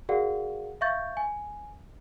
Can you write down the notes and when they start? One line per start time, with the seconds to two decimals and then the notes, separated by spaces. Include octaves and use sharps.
0.09 F#4 G#4 A#4 D5 F5 F#5
0.81 E5 F5 C#6 G6 A6
1.17 G#5